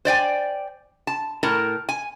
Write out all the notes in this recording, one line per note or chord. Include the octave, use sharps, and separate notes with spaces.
C5 D5 G5 G#5
A5
A2 A#4 A5
G#5